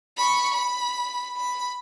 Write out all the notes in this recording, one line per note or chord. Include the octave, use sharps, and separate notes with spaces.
B5 C#6
B5
B5